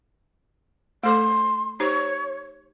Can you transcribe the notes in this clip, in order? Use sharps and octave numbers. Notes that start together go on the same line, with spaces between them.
A3 A4 C6 D6
D#4 G4 C5 C#5